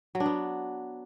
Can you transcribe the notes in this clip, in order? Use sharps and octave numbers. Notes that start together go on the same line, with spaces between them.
F#3
D4
B3